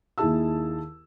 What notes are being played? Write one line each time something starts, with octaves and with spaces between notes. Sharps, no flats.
D#2 D#3 E4 G#4 A5 E6